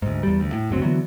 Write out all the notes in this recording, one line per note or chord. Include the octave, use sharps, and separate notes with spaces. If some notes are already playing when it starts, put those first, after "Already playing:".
D2 G#2
E2 G3
D2
A2
F#1 D2 F#3 C4
D3 E3 F#3 B3